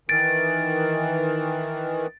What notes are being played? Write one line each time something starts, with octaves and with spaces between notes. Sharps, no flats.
D#3 E3 A6 D7